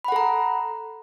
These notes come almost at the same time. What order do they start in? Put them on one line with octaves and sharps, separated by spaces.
B5 F#5 A4 A#5